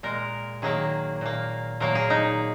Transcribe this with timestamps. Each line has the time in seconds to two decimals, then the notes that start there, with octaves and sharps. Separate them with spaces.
0.03 A#2 G#3 A#4
0.62 D#3 F#3 A#3 G#4
1.21 A#2 A#3
1.80 A#2 F#3 A#3 A#4
1.95 G#4
2.10 D#4